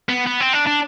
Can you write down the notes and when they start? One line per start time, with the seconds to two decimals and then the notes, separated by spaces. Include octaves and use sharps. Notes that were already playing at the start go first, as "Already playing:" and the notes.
0.09 B3
0.26 B3
0.40 C4
0.53 D4
0.67 D4